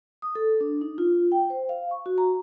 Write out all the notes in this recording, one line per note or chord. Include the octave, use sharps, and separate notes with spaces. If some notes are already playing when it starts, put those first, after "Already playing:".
D#6
A4
D4
D#4
F4
G5
C5
F5
C#6
F#4
A#5